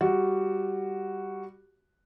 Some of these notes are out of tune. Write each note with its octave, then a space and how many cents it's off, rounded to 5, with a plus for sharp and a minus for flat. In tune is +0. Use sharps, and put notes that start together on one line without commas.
G3 +0 F#4 +0